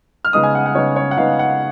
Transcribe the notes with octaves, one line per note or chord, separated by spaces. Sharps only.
F6
C#3 G#3 B3 D#4 D#6
G#5
F#5
F#5
C#3 G#3 B3 D#4 C#5
C#5
F#5
C#3 G#3 B3 D#4 F5
F#5